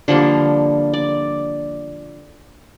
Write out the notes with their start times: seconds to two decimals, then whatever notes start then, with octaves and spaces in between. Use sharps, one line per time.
0.08 D3 F3 G3 A#3
0.94 D5